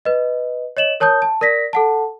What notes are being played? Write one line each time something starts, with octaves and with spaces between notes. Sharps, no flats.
B4 D#5
C#5 D#5 E7 F#7
A#4 C#5 A5 D#6 G6
A5
A#4 D5 A#6 B6
A4 F#5 A5